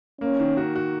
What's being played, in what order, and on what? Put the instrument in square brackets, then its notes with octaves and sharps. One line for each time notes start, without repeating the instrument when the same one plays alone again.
[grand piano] A#3 [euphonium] C#4
[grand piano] D#3
F#4
F#4